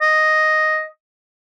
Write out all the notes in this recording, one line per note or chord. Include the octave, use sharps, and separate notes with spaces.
D#5